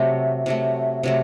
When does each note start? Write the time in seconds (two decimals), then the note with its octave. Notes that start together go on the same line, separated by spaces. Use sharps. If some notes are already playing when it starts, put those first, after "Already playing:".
Already playing: C3 F#3 A3
0.46 C3 F#3 A3
1.03 C3 F#3 A3